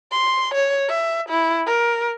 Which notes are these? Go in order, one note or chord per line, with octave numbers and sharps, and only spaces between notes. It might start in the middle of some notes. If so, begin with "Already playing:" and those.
C6
C#5
E5
E4
A#4